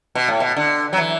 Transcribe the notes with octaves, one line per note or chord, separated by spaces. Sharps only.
B2
A2
B2
D3
F#3
E3